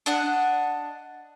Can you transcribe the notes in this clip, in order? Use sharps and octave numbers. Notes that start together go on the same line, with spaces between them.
D4 D#5 F#5